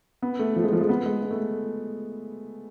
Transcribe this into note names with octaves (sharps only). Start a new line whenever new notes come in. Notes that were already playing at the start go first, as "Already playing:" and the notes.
B3
A3
F3
G#3
F3
G#3
B3
G#3
G#3
A3